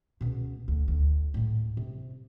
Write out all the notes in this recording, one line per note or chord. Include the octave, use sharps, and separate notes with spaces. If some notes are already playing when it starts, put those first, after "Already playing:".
C#2 B2
D2
D2
A2 G#3
C3